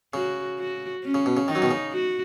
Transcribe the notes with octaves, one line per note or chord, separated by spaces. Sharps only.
C#3 F#4
F#4
C#4
C#3
B2
C#3
D#3 D#4
F#3
B2 D#3
C#3
F#4